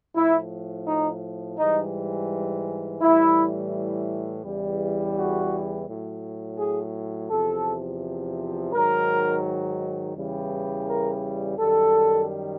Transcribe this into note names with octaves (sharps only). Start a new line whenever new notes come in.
A2 F3 E4
D#4
G#2 E3 G3 D#4
A2 E3 G3 E4
E2 C#3 E3 G3
F#4
A2 F#3
G#4
E2 C3 F3 A4
G#2 D#3 F#3 A#4
E2 C#3 E3 G3
A#4
F#2 D#3 G3 A4